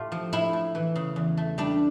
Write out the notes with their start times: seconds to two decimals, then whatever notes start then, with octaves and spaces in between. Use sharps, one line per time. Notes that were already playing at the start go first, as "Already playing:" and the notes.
Already playing: A2 A3 F4 G4
0.12 F3
0.33 A2 E4
0.53 A2
0.75 E3
0.96 C#3
1.16 E2
1.37 A3
1.58 G3 D4